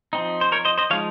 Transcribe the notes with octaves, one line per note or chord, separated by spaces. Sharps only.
F3 C4 D#4
C5
A#4 C#5
C5 D#5
C5 D#5
F3 G#3 D#4 C#5 F5